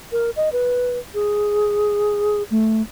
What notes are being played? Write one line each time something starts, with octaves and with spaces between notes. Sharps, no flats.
A#4
D#5
B4
G#4
A3